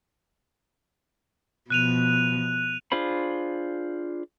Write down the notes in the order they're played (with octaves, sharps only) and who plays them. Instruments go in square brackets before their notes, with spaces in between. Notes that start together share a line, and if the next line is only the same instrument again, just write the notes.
[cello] B2 F3 [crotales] F#6 D#7 F7
[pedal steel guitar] D4 F4 G#4 C5 B5